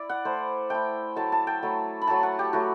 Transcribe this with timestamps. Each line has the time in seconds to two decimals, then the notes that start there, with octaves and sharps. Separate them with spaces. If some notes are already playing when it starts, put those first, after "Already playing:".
Already playing: E4 D5
0.09 F#5
0.25 A3 E4 C5
0.70 A3 E4 G5
1.16 F#3 A3 E4 A5
1.32 A5
1.47 G5
1.63 F#3 A3 E4
2.02 B5
2.07 F#3 A3 E4 A5
2.23 F#5
2.39 G4
2.53 F#3 A3 E4 F#4